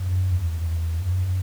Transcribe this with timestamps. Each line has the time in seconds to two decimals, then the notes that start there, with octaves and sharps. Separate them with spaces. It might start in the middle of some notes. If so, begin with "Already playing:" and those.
Already playing: F#2
0.31 E2
0.99 F#2